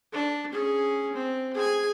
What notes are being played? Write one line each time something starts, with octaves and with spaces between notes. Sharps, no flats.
D4
C#4 G#4
C4
G#4 G#5